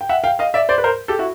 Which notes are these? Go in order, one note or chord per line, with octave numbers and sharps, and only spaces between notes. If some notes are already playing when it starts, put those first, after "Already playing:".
G5
E5 F#5
F5 G5
D#5 F5
D5 E5
C5 D5
B4
A#4 C5
G4 A4
E4 F#4